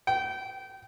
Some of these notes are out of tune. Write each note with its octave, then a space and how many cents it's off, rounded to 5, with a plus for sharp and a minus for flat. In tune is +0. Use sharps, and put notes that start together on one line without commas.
G5 -25